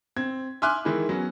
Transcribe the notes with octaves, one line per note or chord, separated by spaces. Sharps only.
C4 G#6
E5 G#5 C6 D6 F6 F#6
D#3 E3 G#3 E4
F#3 B3 C#4